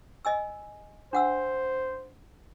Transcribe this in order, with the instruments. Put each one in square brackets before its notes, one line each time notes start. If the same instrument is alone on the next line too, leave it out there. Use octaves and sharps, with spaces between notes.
[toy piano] D#5 G#5 E6
[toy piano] D4 F#5 E6 [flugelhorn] C5